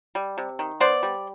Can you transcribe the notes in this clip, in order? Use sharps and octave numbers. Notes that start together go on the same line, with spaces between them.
G3
C3
D#3
B3 C5 D5
G3